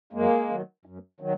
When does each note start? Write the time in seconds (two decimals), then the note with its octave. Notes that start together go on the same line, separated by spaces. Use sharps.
0.13 F#2 G#3 A#3
0.49 D#3 F#3
0.85 F#2
1.20 D#3 F#3